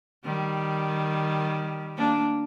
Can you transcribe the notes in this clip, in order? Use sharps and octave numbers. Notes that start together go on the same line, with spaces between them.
D#3 G3
A#3 D4